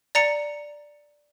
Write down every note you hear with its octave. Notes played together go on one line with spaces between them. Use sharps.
D5 A#5 C#7